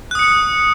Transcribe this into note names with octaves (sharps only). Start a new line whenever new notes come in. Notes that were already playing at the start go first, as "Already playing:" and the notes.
D#6 F#6 C#7